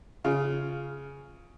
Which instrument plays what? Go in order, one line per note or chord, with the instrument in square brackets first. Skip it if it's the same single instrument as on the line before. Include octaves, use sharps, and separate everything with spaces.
[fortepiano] C#3 F4